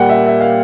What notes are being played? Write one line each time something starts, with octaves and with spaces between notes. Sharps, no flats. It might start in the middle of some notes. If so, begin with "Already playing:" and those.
Already playing: A#2 G3 A#3 F#5 G5
E5
E5
F5